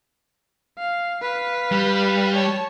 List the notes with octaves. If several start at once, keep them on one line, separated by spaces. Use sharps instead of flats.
F5
B4 F5
G3
C#5 A5